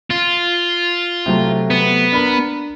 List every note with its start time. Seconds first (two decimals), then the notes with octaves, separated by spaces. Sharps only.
0.11 F4
1.26 C3 F#3 A3
1.70 B3
2.12 D4 A#4 B5